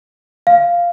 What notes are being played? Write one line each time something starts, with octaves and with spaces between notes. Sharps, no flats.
F5